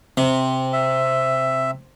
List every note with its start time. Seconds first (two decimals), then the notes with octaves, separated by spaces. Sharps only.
0.17 C3
0.73 E5